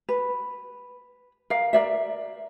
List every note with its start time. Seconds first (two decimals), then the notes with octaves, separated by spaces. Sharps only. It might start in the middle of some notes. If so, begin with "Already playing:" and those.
0.09 B4
1.50 A#4 F5
1.73 A#4 D5 E5